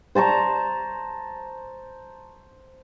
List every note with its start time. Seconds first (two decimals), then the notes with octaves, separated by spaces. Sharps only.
0.15 C5 A5 A#5 C#6